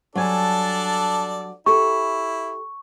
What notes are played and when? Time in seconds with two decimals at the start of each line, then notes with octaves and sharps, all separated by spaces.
0.15 F#3 G3 D4 A4 D5 G#5
1.66 E4 G4 A4 C#6